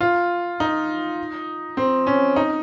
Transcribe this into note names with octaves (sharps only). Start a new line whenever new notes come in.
F4
D#4
C4
C#4
D#4